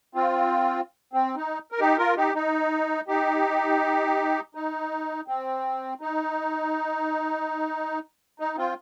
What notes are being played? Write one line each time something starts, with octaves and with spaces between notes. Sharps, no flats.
C4 F4
C4
D#4
A#4
D#4 G4
F4 A#4
D#4 G4
D#4
D#4 G4
D#4
C4
D#4
D#4
C4 F4